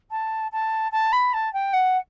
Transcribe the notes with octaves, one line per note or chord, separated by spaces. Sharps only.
A5
A5
A5
B5
A5
G5
F#5